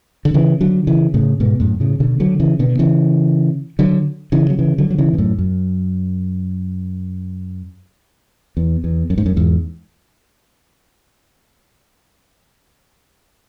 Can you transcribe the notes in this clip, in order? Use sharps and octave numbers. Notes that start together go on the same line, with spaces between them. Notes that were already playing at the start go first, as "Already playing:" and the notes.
D3
C#3 E3
D3 F#3
C#3 E3
A2 C#3
G#2 B2
F#2 A2
A2 C#3
B2 D3
D3 F#3
C#3 E3
B2 D3
C#3 E3
D3 F#3
C#3 E3
F#3
C#3 E3
D3 F#3
F#3
C#3 E3
B2
F#2 A2
F#2
E2
E2
F#2
G#2
F#2
E2 G#2